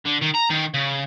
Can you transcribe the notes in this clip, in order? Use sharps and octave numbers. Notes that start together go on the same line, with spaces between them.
D3
D#3
A#5
D#3
C#3